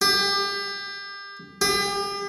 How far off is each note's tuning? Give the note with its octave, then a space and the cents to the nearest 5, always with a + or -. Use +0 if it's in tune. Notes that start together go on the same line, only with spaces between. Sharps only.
G4 +30
G4 +40